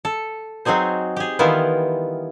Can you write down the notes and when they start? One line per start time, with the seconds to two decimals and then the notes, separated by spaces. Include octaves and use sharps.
0.05 A4
0.65 F#3 C4 D#4 G#4 C5
1.16 G4 G#4
1.39 D#3 E3 G3 B3 E4 F4